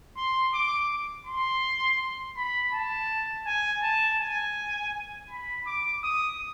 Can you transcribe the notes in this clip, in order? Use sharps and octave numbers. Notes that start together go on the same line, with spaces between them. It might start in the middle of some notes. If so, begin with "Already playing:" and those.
C6
D6
C6
B5
A5
G#5
A5
G#5
B5
D6
D#6